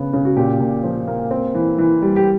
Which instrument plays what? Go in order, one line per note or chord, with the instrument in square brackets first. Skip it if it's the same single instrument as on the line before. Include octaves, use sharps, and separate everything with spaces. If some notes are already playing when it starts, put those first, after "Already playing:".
Already playing: [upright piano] C#3 B3
C#3
F#4
A#2 G4
A#2
F3
A#3
C4
E3
E3
G3
G4